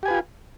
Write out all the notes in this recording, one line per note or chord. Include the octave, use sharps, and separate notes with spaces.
F4 G4 B4 G#5